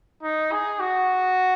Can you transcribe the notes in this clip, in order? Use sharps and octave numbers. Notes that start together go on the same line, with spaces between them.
D#4
G#4
F#4